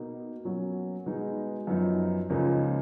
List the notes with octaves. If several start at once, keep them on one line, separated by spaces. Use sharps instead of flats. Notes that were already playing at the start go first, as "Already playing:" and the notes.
Already playing: B2 A#3 D#4
B2 F#3 A#3 C#4
B2 G#3 B3 D#4
F#2 F3 B3 D#4
C#2 C#3 F3 A#3 D#4